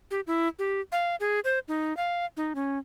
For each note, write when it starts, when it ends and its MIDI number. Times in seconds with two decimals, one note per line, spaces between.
0.11 0.21 67
0.27 0.48 64
0.59 0.81 67
0.92 1.16 77
1.20 1.40 68
1.44 1.59 72
1.68 1.96 63
1.97 2.26 77
2.37 2.53 63
2.55 2.78 61